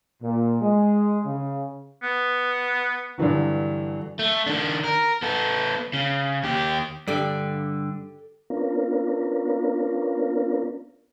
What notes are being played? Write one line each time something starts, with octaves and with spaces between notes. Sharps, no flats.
A#2
G#3
C#3
B3
G2 D3 E3 F#3
A3
D#3 D4
A#4
B3 A4
C#3
D#2 G4
G2 D3 G4 A4 D5
B3 C#4 D4 F4 A#4